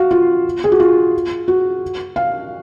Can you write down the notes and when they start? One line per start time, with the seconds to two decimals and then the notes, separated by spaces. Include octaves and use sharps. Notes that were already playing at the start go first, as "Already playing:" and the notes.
Already playing: F#4 F5
0.11 F4
0.64 G#4
0.72 F#4
0.80 F4
1.48 F#4
2.16 F5